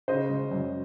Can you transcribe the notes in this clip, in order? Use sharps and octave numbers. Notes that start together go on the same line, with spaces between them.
C#3 C5 D#5
G#3
F#2